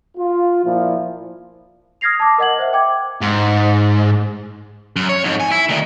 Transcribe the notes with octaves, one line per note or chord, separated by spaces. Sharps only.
F4
A#2 F3 E4 F4
D#6 F6 G#6 A#6 C7 F7
A5 D6
A#4 D#5 F#5 G#6 F#7
C5 E5
G5 D6 G#6
G#2
F#2
C#5
F2 G#2
G#5
E4
D2 D#3